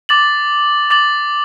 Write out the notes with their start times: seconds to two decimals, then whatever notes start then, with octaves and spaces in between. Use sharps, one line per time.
0.09 D6 A6 F#7
0.90 D6 A6 F#7